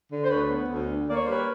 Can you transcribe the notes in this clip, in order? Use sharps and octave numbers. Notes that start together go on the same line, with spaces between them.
D3
C5
D2 B4 C#5
B3
D2
D3
A#3 D5
C#5
C5
G3 B4 C#5